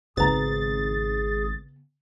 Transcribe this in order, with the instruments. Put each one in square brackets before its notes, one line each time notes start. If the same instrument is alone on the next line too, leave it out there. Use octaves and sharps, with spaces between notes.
[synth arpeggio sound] G#1 A6 [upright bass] C#3 B3 [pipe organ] G#4 [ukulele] B4 A#5